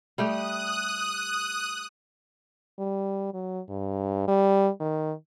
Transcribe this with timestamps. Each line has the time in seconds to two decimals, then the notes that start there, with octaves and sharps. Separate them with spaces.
0.18 G3 A3 G4 D#6 F#6
2.79 G3
3.34 F#3
3.69 G2
4.28 G3
4.80 D#3